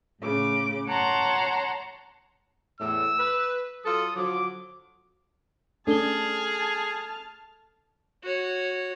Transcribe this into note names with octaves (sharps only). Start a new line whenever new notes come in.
A2 C#3 D6
C#5 F#5 A5 A#5 C6
E2 A2 E6
B4
F#3 F4 A4 D#6
D3 F3 F#3 D6
A3 C#4 D4 G#4 A4 A5 F6 G7
F#4 C#5